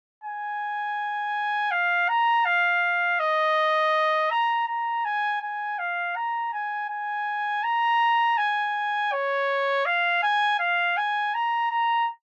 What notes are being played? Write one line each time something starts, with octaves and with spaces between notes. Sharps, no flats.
G#5
F5
A#5
F5
D#5
A#5
A#5
G#5
G#5
F5
A#5
G#5
G#5
A#5
G#5
C#5
F5
G#5
F5
G#5
A#5
A#5